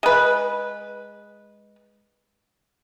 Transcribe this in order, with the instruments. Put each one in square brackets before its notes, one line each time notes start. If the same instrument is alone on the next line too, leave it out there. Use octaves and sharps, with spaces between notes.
[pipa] G#3 B4